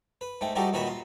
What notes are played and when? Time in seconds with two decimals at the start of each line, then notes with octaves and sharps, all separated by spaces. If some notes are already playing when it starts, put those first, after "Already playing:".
0.21 B4
0.41 G#2 A3 G5
0.55 F3 G3 D#4 F#4 G4 A4
0.73 D#2 A#2 D#4 F#4 B4 E5
0.87 F4